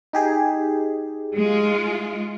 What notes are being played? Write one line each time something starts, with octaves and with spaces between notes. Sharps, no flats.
D#4 G4 G#4
G#3 F4